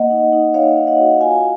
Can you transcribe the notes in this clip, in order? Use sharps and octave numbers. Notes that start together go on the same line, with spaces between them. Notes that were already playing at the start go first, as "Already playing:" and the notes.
Already playing: A#3 D#5 F#5
D#4
D#4
A#3 C#5 F5
D#4
D#5 F#5
F#4
F4 F5 G#5